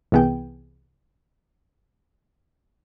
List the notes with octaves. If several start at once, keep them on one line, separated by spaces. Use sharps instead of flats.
C2 E3 B3 G#4 G5